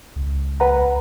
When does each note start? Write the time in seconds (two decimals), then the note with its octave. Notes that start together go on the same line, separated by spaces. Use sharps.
0.16 C#2
0.60 B4 F#5 A#5